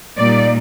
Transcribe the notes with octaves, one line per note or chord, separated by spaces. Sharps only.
A#2 G3 A#3 D#4 D5